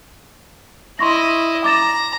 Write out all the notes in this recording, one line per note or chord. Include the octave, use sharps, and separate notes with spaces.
E4 D#5 C6 C#6 A#6
A#5 D6 A6 E7